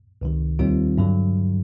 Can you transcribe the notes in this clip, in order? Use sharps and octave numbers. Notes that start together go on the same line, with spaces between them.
C#2 C3 D#3
D#2 D#3 G3 C4 F4
G2 D3 F#3